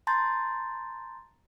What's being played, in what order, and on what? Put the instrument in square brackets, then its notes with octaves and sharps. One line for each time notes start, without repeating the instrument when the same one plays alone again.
[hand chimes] A5 A#5 C6 G6 A6